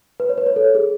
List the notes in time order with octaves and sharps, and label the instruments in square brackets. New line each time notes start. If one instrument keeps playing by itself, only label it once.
[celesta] B4
C#5
B4
C#5
A4
G#4